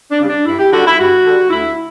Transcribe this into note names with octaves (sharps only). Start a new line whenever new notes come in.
D4
C#3 G3
D4
G2 E4
G4
D3 G3 F#4
E4
G2 F#4
D3 G3
D2 E4